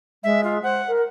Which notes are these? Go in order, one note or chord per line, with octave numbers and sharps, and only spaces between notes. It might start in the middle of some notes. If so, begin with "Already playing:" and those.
G#3 E5
F4
C5 F#5
A#4